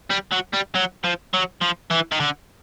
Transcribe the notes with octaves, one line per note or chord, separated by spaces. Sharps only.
G3
F#3
G3
F#3
F3
F#3
F3
E3
D#3
D3